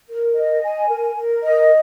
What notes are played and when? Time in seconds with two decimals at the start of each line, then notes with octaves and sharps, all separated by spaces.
0.08 A#4
0.35 D#5
0.62 G#5
0.89 A#4
1.15 A#4
1.43 D#5